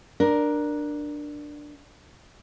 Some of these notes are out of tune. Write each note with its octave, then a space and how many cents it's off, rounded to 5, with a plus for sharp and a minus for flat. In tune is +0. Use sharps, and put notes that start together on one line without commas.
D4 +10 A#4 +10